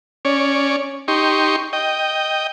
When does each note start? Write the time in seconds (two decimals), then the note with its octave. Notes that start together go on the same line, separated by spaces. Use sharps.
0.25 C#4 C#5 D5
1.08 D#4 G4 C6 C#6
1.73 D#5 G5